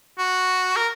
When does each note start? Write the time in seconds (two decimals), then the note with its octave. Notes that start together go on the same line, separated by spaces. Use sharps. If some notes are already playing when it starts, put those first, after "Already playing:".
0.18 F#4
0.76 A#4